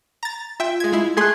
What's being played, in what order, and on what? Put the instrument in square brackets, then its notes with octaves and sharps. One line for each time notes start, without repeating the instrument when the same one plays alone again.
[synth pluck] A#5 A6
[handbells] F4 [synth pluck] E5 G5
[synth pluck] G#3 G#6
G#3 E4
[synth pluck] A3 G#4 C6 [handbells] F#6 G#6